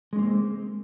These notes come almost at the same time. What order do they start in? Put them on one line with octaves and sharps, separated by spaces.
G#3 C#4 A#3 C4